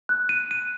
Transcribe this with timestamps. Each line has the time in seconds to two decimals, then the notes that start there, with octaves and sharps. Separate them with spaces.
0.09 F#6
0.29 D#7
0.51 D#7